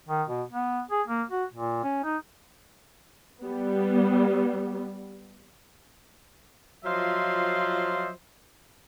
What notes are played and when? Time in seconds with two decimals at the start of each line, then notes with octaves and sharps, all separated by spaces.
0.08 D#3
0.28 B2
0.52 B3
0.91 G#4
1.07 A#3
1.30 F#4
1.54 A#2
1.83 C#4
2.04 D#4
3.42 G3 B3
6.85 F3 F#3 F4 C5 D#5 E5